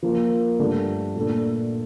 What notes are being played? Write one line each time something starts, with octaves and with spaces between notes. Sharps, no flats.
F3 A#3 F4 A#4
G2 D3 A3 D4 A4
A#2 A3 D4 A4